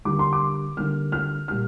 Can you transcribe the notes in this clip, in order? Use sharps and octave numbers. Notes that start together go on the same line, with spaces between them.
D3 G3 A#3 D6
C6
D6
D3 G3 A#3 F6
F6
A#2 G3 A#3 F6